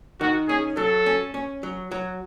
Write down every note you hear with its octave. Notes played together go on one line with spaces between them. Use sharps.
D#3 F#4
C#4 G#4
F#3 A4
C#4
C#4
F#3
F#3